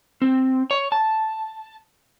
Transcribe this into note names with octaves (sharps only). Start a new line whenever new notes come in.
C4
C#5
A5